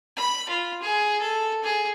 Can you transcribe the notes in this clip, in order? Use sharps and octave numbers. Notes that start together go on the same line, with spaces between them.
B5
F4
G#4
A4
G#4